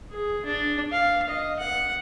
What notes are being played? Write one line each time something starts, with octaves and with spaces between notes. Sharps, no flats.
G#4
D4
F5
D#5
F#5